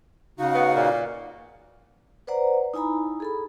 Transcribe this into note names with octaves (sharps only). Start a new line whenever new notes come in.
C#3 D#4 F#4 F5
B3
A#2
B4 C5 D5 F#5 A#5
D#4 E4 G#5 A#5 B5
G#4 A4 B5